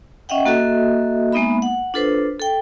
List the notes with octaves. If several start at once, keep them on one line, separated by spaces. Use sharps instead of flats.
C#4 D#5 E5 F#5 G5
A#3 F#4 A4 D#5 E5
G#3 A#3 B3 D#4 E5 B5
F#5
D4 F4 A4 B4 C5
A4 G5